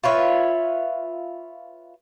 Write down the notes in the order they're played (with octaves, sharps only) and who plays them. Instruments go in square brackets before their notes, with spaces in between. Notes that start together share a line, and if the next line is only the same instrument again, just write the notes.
[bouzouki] F4 B4 C#5 E5